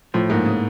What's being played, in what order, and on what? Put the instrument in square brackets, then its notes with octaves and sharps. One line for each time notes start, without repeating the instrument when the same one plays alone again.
[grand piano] A2 [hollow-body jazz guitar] F3
[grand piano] G#2 [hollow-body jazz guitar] A#3
[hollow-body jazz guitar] C#3